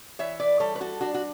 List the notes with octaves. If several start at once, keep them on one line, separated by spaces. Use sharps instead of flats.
E3 C#5 E5
B4 D5
G3 A4 C#5
B4
F#4 A4
D4 F#4
F#4